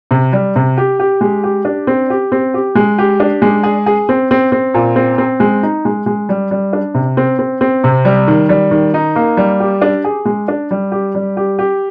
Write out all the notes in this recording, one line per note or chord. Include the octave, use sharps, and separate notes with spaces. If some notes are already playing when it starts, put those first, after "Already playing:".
C3
G3
C3
G4
G4
G#3
G4
D4
C4
G4
C4
G4
G#3
G4
D4
G#3
G#4
G#4
C4
C4
C4
A#2
C4
C4
G#3
D#4
G#3
G#3
G3
G3
D4
C3
C4
C4
C4
C3
G3
D#3
G3
D#3
D#4
A#3
G3
G4
D4
G#4
G#3
D4
G3
G4
G3
G4
G4